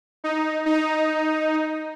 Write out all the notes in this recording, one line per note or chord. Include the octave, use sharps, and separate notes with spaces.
D#4
D#4